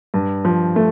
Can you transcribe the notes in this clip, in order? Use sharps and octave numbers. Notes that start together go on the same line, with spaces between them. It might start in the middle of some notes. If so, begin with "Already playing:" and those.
G2
F3
A3